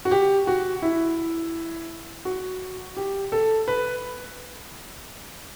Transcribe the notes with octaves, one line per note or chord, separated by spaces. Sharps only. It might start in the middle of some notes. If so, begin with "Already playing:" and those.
F#4
G4
F#4
E4
F#4
G4
A4
B4